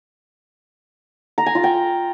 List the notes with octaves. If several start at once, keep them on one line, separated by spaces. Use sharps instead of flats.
A#5
G#5
F4
G5